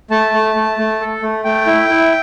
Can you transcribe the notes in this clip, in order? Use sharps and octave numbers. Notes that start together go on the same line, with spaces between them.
A3 A5
A3
A3
A3
A4
A3
A3 G5
E4
E4